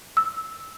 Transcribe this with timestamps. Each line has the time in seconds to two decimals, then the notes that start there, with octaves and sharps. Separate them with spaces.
0.17 E6